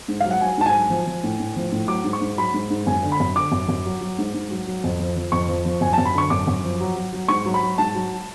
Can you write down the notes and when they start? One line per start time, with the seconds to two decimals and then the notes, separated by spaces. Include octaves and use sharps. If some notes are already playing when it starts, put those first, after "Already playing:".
0.08 G#2
0.21 F#3 F5
0.31 F#5
0.41 F#3 G#5
0.58 G#2 A5
0.66 G#5
0.74 F#3
0.90 F3
1.07 F3
1.24 A2
1.40 A2
1.56 F3
1.72 A2
1.88 F#3 D6
2.04 G#2
2.13 C#6
2.21 G#2
2.37 F#3 B5
2.54 G#2
2.70 G#2
2.87 F#2 G#5
3.03 D3
3.12 B5
3.20 F#2
3.36 D3 D6
3.52 F#2
3.69 F#2
3.86 F#3
4.01 F#3
4.18 G#2
4.34 G#2
4.51 F#3
4.67 F#3
4.84 F2
5.00 F3
5.16 F3
5.32 F2 C#6
5.48 F3
5.65 F3
5.81 F#2 G#5
5.93 F#2 A5
6.05 B5
6.14 D3 C#6
6.30 F#2 D6
6.47 F#2
6.64 F3
6.81 F#3
6.96 F#3
7.13 F#3
7.28 G#2 C#6
7.45 F#3
7.54 B5
7.62 F#3
7.78 G#2 A5
7.95 F#3